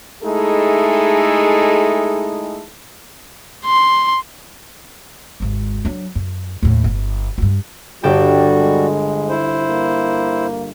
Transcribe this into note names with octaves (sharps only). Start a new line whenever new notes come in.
G#3 A3 D#4 E4 G#4 A4
C6
G#1 D#2
F#3 D4
F#2
D#2 A2
G1
G2 F4
G1 G3 F#4 G4 A4 G5
G#3
E4 C5
A#3